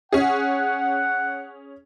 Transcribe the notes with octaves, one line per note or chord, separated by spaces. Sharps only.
C#4 G#4 F#5